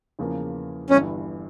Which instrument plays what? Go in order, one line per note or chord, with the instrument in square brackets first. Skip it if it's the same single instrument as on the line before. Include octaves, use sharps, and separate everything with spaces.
[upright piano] E2 C#3 F3 A#3
[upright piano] G1 G2 E3 [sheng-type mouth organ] C#4